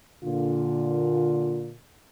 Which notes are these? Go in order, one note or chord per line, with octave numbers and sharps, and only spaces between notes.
A#2 D3 F4